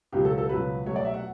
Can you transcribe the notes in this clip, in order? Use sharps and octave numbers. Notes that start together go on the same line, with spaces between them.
C#2 B2 F#3 G4
A4
A4
C#2 B2 F#3 B4
B2 F#3 A3 C#5
D5
E5
F#5